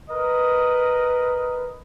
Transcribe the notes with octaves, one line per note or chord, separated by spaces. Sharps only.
A#4 B4 D#5